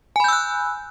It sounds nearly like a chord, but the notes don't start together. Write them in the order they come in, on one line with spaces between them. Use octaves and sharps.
G#5 B5 G6 E6 F#6